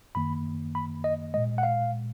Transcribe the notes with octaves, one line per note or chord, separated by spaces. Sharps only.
F#2 D#3 A#3 B5
B5
D#5
A#2 G#3 D#5
F#5
F5